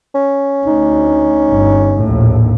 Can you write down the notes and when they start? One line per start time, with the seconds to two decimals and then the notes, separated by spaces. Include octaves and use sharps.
0.15 C#4
0.65 D2 D#4
1.48 G1
2.00 A#1 D#2 A2